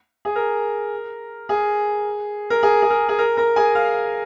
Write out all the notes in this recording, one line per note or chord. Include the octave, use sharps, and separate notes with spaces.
G#4
A#4
G#4
A#4
G#4
G#4
A#4
G#4
A#4
A#4 A#5
G#4 G#5
F5 F6